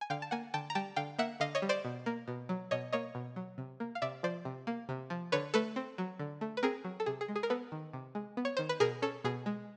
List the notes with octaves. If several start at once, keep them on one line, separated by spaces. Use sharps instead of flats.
G#5
D3 F5 G5
A5
A#3 F#5 G#5
D3 G5 A5
A#5
G3 G5 A5
D3 F5 G5
A#3 E5 F#5
D3 D#5 F5
C#5 D#5
G3
C5 D5
B2
A#3
B2
F#3
B2 C#5 D#5
A#3 C#5 D#5
B2
F#3
C3
A#3
F5
C3 D5 E5
F3 C5 D5
C3
A#3
C3
F3
D3 B4 C#5
A3 A4 B4
C4
F#3
D3
A3
B4
C4 G#4 A#4
F#3
A4
C3 G#4
G#4
G#3
G#4
A#4
B3 A4 B4
D#3
C3
G#3
B3
C#5
D#3 C5
B4
B2 G#4 A#4
C#4 A4
B2 G#4
G#3